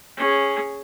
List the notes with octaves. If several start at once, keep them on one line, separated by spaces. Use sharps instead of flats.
C#4 G#4